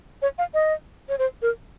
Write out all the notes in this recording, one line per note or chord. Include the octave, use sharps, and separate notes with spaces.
C#5
F5
D#5
C#5
C5
A#4